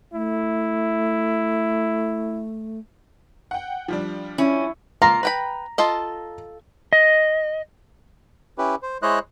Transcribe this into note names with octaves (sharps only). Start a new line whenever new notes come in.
A3 E4
F#5 G5
F3 G3 D4
C#4 E4
A#3 F4 A#5
B4 G5 B5
F4 A4 D#5
D#5
C#4 E4 G4 B4
C5
G#3 E4 C5 C#5 D#5 F#6